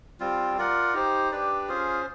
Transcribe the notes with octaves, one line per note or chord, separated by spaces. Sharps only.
G3 C4 F4
F4 A#4 D5 F#5
D#4 G4 C5
D4 G4 B4 D5
C#4 F4 G#4 C5